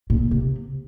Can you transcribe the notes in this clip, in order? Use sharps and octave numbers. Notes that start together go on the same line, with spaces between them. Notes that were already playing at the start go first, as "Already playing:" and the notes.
A#2
C3